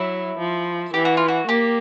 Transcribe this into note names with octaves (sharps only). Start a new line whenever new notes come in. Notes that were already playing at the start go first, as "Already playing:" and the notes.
Already playing: F#3 E4
F3
E3 G4
F#4
F4
F#4
A#3 G4